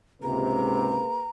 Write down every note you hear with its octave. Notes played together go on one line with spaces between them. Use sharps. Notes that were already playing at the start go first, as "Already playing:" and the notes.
C#2 G#2 C3 A#3 G#4 B4 A#5